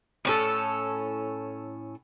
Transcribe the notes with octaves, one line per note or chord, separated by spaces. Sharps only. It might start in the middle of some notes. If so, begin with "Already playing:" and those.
A2 C#4 A4